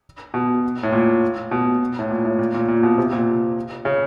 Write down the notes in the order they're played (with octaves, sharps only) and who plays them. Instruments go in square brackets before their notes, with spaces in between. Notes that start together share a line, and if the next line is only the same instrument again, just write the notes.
[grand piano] B2
A2
A#2
B2
A2
A#2
A2
A#2
A#2
A#2
B2
C3
A#2
C#3